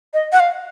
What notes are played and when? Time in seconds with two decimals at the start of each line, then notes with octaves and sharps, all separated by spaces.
0.14 D#5
0.32 F#5
0.40 F5